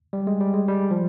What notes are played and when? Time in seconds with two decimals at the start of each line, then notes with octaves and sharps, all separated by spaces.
0.13 G3
0.27 G#3
0.41 G3
0.54 G#3
0.68 G3
0.91 F3